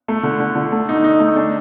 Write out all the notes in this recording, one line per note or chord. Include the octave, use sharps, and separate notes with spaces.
A3
D3
D3
D3
A3
D#4
D#4
A3
D4